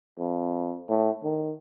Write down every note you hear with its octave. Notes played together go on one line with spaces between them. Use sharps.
F2
A2
D#3